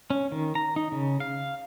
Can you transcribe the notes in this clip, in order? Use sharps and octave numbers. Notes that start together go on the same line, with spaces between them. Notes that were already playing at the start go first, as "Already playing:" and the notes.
C#4
D#3
A#5
D#4
C#3
F5